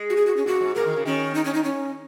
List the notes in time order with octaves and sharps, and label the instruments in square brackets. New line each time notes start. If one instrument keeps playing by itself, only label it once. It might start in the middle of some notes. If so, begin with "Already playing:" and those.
Already playing: [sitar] G#3
[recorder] F#4
G#4
F#4
C#4
[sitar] A#2 [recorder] F#4
[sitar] G#2
[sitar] A#2 [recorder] A#4
[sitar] D#3
C#3
[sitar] D#3 [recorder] C#4
[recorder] D#4
C#4
D#4
C#4